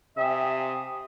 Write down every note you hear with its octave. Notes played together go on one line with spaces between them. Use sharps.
C3 E5 F5 G5 G#5 D#6